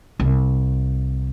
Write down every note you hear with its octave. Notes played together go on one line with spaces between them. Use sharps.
C2